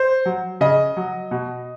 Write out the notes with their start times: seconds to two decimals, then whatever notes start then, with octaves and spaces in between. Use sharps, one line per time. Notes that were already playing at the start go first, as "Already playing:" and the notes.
Already playing: C5
0.25 F#3
0.61 C#3 D#5
0.97 F#3
1.31 B2